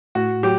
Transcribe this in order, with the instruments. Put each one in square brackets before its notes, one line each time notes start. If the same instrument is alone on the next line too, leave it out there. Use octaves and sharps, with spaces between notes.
[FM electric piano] A2 [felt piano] F#4
[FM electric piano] F#3 [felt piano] G4